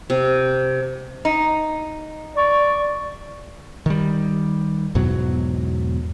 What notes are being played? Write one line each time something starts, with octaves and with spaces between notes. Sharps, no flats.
C3
D#4
D5 C#6
D#3 G3
E2 G#2 B2 F#3